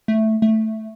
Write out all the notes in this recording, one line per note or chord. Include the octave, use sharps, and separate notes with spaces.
A3
A3